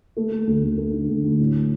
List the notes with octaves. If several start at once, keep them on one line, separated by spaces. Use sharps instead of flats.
A3
A3
D2
D2
A3
D3
D2
D2
A2
A2